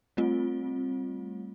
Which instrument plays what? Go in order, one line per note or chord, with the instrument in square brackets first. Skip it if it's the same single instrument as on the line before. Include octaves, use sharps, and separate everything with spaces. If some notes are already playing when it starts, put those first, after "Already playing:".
[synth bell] G3 A3 C4 F4